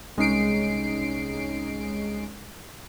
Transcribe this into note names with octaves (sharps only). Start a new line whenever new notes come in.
C2 G#3 C#4 D#4 C7 D7